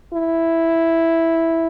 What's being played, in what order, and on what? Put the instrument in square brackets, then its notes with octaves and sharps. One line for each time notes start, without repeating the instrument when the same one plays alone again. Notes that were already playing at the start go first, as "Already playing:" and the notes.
[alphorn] E4